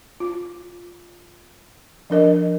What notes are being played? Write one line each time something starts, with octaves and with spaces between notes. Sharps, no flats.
F4
F3 D4 A#4 D#5